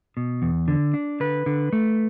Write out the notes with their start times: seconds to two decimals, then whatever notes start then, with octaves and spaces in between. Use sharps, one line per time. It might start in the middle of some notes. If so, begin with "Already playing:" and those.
0.17 B2
0.42 E2
0.68 D3
0.94 D4
1.20 D3 B4
1.46 D3
1.73 A3